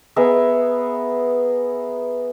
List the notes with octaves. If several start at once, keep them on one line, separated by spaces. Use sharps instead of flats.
B3 G#4 A#4 E5